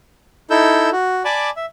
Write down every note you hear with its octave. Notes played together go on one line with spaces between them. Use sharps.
D#4 E4 A4 E6 G6
F#4
D5 G#5 A5 B5 D6
E5